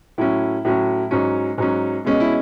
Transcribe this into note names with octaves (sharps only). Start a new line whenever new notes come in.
A2 F#3 C#4 E4
A2 F#3 C#4
G#2 F#3 C#4
G#2 F#3 C#4
B2 G#3 C#4
E4